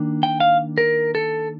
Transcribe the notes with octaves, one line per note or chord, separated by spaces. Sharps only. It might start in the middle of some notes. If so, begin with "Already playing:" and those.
Already playing: D#3 A#3 D4
G5
F5
A#4
A4